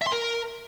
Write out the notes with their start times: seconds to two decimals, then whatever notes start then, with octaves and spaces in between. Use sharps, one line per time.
0.02 E5
0.07 C6
0.12 A#4